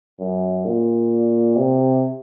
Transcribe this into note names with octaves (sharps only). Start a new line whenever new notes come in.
F#2
A#2
C3